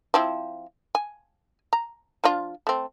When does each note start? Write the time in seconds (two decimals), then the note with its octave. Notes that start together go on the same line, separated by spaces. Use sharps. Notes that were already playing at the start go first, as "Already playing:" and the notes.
0.14 F3 C4 E4
0.95 G#5
1.73 A#5
2.24 F3 D4 F4
2.67 A3 C4